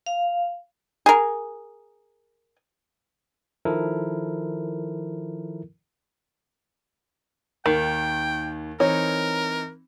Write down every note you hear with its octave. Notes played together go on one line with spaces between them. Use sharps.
F5
G#4 A#4
D#3 F3 E4 A4 A#4
D#2 D#3 G5
E3 C4 D#4 A#4 C#5